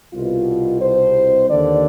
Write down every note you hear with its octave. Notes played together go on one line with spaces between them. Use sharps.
C2 B2 F4
C5
D#2 D3 D5